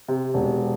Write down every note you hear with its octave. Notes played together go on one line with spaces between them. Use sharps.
C3
E1